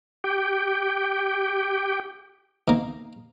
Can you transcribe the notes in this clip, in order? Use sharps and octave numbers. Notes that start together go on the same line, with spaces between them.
G4 G5
D#3 A#3